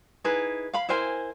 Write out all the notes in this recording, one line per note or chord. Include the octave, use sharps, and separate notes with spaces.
D#4 E4 G#4 B4
F5 B5
E4 A#4 C5 G#5